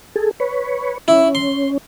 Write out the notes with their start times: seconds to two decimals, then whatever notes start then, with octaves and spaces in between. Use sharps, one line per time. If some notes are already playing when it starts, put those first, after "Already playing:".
0.16 G#4 A4
0.40 B4 C#5
1.08 C#4 E4
1.35 C6